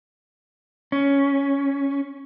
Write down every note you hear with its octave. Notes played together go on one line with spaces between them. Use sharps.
C#4